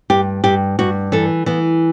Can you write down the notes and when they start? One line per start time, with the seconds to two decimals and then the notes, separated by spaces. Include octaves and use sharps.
0.10 G2 G4
0.44 G2 G4
0.79 G2 F#4
1.12 E3 A4
1.46 E3 B3